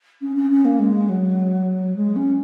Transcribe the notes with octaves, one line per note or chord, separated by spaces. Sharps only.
C#4
C#4
C#4
A#3
G#3
F#3
G#3
C#4